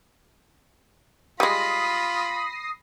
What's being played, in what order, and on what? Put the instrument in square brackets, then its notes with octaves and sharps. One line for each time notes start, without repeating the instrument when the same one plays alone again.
[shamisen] G3 G#3 [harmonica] F4 [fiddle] B5 [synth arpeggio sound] D#6 A#6 C7